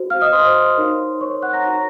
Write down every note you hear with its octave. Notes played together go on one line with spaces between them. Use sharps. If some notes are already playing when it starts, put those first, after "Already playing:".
Already playing: F#4 C5
F5 F6
D#5 D#6
C5 C6
D#4 A#4 C#5
C#5 C#6
F#5 F#6
A#5 A#6
D#4 F#4 A#4 C#5 A#5 A#6